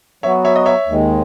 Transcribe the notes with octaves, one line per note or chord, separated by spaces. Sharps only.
F#3 B3 F#4 C#5 E5
C#5 E5
D#5
C#5 E5
D#2 D#3 G#3